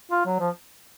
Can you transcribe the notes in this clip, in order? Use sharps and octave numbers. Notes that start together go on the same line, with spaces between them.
F4
F#3
F3